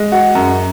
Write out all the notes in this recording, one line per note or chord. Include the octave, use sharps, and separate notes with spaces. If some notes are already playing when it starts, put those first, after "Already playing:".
Already playing: G#3
F#4
F#2